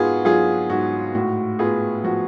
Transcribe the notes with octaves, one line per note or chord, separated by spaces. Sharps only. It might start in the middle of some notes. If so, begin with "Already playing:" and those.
Already playing: G#2 B3 F4 F#4 G#4
F#3 F4 G#4
G#2 F#4
A2 F#4
B3 F4 G#4
F3 F#4